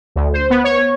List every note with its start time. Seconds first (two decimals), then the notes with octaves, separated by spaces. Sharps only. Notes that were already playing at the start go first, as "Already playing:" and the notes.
0.16 D2
0.33 C5
0.50 B3
0.64 C#5